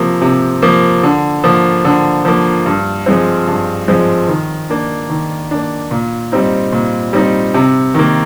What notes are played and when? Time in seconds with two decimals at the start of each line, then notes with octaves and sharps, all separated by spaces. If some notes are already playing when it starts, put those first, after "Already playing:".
Already playing: C3 F3 A#3
0.22 C3
0.62 F3 A#3
1.03 D3
1.44 F3 A#3
1.85 D3
2.25 F3 A#3
2.66 G2
3.06 F3 G#3 C4
3.48 G2
3.88 F3 G#3 C4
4.28 D#3
4.70 A#3 D4
5.10 D#3
5.51 A#3 D4
5.91 A#2
6.32 G3 C4 D#4
6.72 A#2
7.13 G3 C4 D#4
7.54 C3
7.94 D#3 A#3